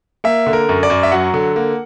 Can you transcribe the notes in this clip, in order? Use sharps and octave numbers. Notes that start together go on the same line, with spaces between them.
A#3 E5
D3
A#4
F#2
D5
F#2
E5
F#3 F#5
D3
A#3